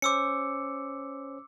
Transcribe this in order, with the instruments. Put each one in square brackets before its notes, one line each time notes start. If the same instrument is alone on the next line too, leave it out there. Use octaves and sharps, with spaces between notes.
[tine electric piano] C#4 C5 [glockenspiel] D6 E6 C#7